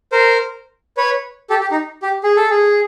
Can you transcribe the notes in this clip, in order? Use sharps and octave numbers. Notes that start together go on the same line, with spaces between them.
A#4 C5
B4 C#5
G4 A4
G4
D#4
G4
G#4
A4
G#4